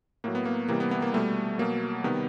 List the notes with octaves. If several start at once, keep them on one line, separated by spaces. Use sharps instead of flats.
A2 F#3 A#3
B3
A#3
C3 E3 G3 A#3
B3
B3
A#3
B2 G3 A3
B2 F#3 A#3
C3 D#3 G3 B3